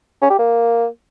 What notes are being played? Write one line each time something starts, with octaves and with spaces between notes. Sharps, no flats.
C#4
G4
A#3